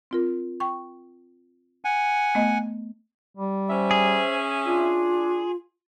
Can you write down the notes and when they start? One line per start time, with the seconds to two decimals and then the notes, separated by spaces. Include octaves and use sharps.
0.11 C4 F4 A#4
0.60 G5 C#6
1.85 F#5 G#5
2.35 A3 B3 D#5
3.36 G3
3.70 C#4 C5 E5
3.91 G#4
4.65 D4 F4